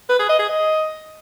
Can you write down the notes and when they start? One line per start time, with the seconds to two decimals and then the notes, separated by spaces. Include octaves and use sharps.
0.09 B4
0.19 G#4
0.29 D#5
0.39 G#4
0.49 D#5